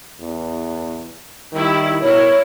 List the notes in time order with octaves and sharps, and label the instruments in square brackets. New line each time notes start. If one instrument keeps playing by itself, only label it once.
[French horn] E2
[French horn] D#3 [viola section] G3 E4
[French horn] B2 [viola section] E4 A#4 [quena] C#5